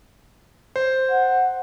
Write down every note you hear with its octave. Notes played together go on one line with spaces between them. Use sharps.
C5
F#5